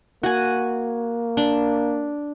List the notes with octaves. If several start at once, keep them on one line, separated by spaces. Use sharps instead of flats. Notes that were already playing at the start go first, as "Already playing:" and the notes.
A#3 F#4 G#5
D4